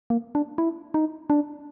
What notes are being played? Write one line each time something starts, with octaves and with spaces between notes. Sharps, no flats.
A#3
D4
E4
D#4
D4